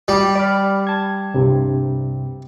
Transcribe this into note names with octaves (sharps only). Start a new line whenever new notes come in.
G3
D5 B5 F6
A5 G#6
C2 G2 C3